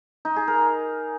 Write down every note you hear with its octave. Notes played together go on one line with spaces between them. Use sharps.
D#4
G#4
A#4